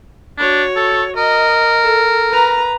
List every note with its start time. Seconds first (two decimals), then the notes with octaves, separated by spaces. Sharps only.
0.38 D4 F#4 C#5
0.76 A4
1.17 A#4 D#5
1.83 A4
2.31 B4 A#5